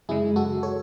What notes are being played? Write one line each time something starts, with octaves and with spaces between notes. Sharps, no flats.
F#2 C#3 G#3 E4 G#4
F#4 A4
A4 C#5